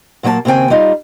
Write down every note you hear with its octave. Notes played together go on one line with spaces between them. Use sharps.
A#2 F#3 A#3 C#5 A5
D#2 C#3 C4 A#4 G5 G#5
G3 D#4 F4